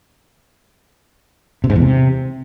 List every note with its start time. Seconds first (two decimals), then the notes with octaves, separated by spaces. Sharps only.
1.64 C3
1.70 G#2
1.76 E2
1.81 C3